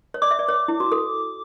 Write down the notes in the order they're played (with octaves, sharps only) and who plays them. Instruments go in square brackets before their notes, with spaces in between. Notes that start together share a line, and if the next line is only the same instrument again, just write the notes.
[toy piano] C#5
[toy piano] D5 [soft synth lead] D6
[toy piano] E5
D5
C#5
E4
F#4
A4